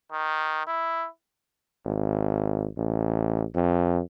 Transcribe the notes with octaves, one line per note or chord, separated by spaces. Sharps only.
D#3
E4
G#1
A1
F2